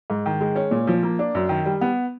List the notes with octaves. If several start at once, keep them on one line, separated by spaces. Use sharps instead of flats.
G#2
D#3
G#3
C#4
A#2
F3
A#3
D4
F#2
D#3
G3
B3